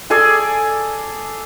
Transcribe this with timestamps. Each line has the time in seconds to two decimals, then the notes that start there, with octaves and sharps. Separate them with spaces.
0.10 G#4 A4 D5 G#5